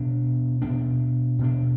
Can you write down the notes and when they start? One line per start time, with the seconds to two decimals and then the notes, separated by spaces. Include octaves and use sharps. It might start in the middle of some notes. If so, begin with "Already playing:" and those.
Already playing: B2 B3 D4
0.62 B2 B3 D4
1.39 B2 B3 D4